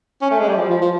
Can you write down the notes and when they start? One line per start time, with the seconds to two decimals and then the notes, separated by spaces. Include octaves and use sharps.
0.22 C#4
0.31 A3
0.40 G#3
0.49 G3
0.57 F3
0.69 F3
0.82 F3